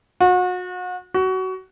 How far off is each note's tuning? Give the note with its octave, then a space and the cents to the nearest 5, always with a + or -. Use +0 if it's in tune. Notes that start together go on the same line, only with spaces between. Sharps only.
F#4 -35
F#4 +20